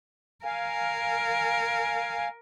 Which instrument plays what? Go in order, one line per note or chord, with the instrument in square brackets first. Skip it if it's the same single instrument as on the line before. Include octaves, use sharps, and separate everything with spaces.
[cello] A#4 [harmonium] F5 G#5